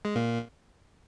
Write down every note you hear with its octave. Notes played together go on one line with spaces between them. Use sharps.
G#3
A#2 A#3